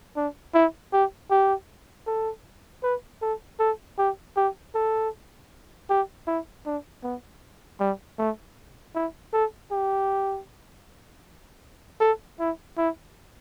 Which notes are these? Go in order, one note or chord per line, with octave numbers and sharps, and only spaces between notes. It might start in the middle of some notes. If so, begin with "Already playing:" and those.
D4
E4
G4
G4
A4
B4
A4
A4
G4
G4
A4
G4
E4
D4
B3
G3
A3
E4
A4
G4
A4
E4
E4